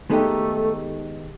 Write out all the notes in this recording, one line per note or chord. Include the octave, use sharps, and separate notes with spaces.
D#3 G#3 A3 B3 D#4 G4